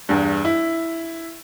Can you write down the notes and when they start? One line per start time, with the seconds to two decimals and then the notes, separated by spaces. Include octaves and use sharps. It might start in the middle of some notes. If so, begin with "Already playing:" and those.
0.09 E2 G2
0.45 E4